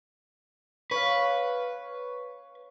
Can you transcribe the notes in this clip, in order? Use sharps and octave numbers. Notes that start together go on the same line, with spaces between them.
B4 C#5 F5